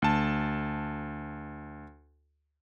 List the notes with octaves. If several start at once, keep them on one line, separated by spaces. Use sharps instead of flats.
D2 A5